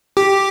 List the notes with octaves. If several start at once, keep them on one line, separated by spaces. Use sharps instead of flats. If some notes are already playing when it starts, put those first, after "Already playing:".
G4